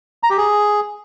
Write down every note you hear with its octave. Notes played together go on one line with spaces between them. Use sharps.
A#5
G4
G#4